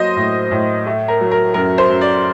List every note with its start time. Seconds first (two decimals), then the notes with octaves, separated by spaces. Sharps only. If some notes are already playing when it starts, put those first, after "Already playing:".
Already playing: F#3 A#3 C5 D#5
0.16 A2
0.51 A2
0.86 A3
1.08 A#4
1.21 F#3
1.32 A#4
1.54 F#2 A#4
1.78 C5
1.90 F#2
2.01 D5